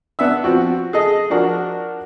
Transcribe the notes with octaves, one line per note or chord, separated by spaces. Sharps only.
B3 D4 E5 E6
F3 C4 F#4
G#4 A4 D#5
F3 D4 F#4 A#4